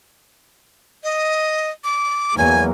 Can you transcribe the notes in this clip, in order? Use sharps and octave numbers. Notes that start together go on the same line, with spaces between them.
D#5
D6
E2 F#3 A#3 G#5